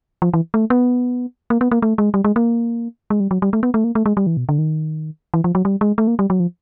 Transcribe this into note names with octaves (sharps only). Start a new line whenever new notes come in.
F3
E3
A3
B3
A#3
B3
A#3
A3
G#3
G3
G#3
A#3
G#3
G3
F#3
G3
A3
B3
A3
A#3
A3
G#3
G3
E3
B2
D3
D#3
E3
F3
F#3
G3
G#3
A3
A#3
G3
F#3
F3